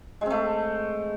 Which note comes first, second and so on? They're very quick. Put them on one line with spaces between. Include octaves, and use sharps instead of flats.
G#3 C4 A3